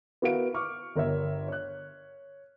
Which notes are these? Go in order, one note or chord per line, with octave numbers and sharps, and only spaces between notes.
B3 E4 F#4 A#4 F5 D7
C#6 D6 F6
G1 A#4 C#5 E5
C#5 F#6